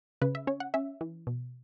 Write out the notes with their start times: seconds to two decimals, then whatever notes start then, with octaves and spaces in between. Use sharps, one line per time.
0.21 C#3 B4
0.35 E5
0.47 C#4 C#5
0.60 F#5
0.74 C#4 E5
1.01 E3
1.27 B2